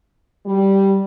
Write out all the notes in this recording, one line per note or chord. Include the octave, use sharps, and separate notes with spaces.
G3